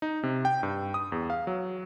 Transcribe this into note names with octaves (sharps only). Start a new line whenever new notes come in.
D#4
C3
G5
G2
D#6
E2
F5
F#3